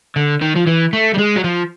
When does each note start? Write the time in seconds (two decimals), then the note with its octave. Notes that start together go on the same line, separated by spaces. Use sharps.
0.16 D3
0.42 D#3
0.56 F3
0.67 E3
0.93 A3
1.14 G3
1.18 G#3
1.36 F#3
1.44 F3